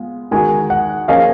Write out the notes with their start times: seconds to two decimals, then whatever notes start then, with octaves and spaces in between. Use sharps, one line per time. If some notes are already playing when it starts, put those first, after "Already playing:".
Already playing: G#3 B3 F4
0.31 D#3 G#3 D#4 F#4 G#5
0.70 F#5
1.08 F3 A#3 C#4 G#4 D#5 F5